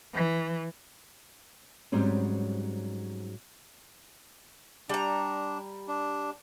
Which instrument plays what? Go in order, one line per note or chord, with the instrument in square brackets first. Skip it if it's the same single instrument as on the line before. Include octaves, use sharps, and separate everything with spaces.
[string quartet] E3
[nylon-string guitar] G#2 F#3 G3 C4 C#4
[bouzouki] G3 A#5 [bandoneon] D4
[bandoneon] D4